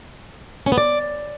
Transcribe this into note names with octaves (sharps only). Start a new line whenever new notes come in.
C#4
B3
D5